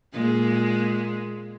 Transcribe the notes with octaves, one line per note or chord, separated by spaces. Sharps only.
A#2 G#3